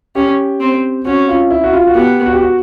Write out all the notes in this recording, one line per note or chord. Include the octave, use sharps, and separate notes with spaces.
C#4 G4
C4
C#4 F#4
F4
E4
F#4
F4
F#4
B3 G4
F#4
G4
F#4